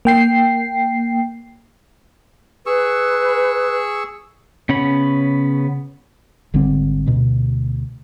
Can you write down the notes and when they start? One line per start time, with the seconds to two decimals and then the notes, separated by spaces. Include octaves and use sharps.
0.05 A#3 G5 C7
2.66 G#4 B4 C#6 E6
4.69 C#3 B3 C#4 C#5 B5
6.54 G#1 D3 G3 C4
7.07 D2 B2